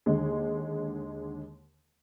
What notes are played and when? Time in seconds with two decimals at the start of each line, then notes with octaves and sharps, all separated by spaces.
0.06 D#2 D3 G#3